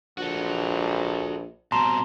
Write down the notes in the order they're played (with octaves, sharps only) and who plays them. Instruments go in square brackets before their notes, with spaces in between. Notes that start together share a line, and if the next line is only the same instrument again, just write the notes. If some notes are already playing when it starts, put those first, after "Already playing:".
[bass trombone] A#1 [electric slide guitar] F#4 A4
[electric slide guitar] B2 G3 C4 [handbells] A5 A#5 C6